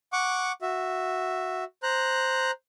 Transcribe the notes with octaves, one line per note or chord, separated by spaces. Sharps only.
F#5 C#6 D6
F#4 E5
C5 A#5 F#6